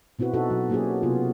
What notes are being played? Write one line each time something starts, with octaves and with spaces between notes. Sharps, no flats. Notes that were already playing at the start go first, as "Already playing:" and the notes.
B2 C4 E4 F#4 B4
B2 D#4 F#4 A4
B2 F#3
F#3 A#3 B3 C#4 G4 G#4
C3 B3 F4